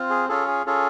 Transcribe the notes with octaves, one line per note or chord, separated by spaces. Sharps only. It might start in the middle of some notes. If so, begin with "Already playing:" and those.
Already playing: C4 F4
G#4
C#4 F4 G#4 A4
G#4
C#4 F4 G#4 A4